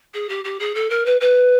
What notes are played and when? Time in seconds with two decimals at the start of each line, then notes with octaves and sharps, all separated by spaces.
0.13 G#4
0.28 G4
0.44 G4
0.59 G#4
0.74 A4
0.89 A#4
1.05 B4
1.20 B4